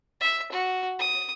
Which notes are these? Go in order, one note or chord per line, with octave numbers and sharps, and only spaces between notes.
E5
F#4
D#6